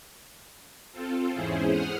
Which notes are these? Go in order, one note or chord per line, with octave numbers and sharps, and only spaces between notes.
C4 F4 A4
E2 G#2 C#4 E4 G#4 C5
F#5 D#6 F6